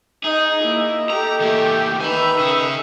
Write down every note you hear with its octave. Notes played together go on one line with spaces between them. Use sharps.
D#4 G#4 D#5
A#3 E4
G4 A4 A#5
E3 A3 A#3 G4
D#3 B4 E5 G#5 B5
C#3 G#4